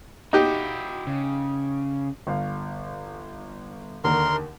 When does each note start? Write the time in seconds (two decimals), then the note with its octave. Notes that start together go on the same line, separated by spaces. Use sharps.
0.33 D#4 E4 F#4 G4
1.07 C#3
2.27 G1 F5
4.04 D#2 D3 A#4 C6